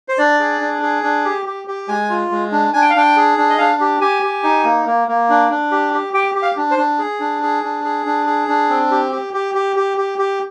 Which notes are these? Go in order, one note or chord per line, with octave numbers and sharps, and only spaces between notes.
C5
D4 D5
G#4
D4
G#4
D4
G4
G4
G4
G#3 G#5
F4
G#3
D4
D4 G#5
G5
F5
D4 G5
G#4
D4
D#5
D4 F5
G4
G4 G#5
G4
D#4
A#3
A#3
A#3
D4
D4
G4
G4
G4 G5
G4
F5
D4
C5
D4
G#4
D4
G#4
D4
G#4
D4
G#4
D4
C4
G4
G4
G4
G4
G4
G4
G4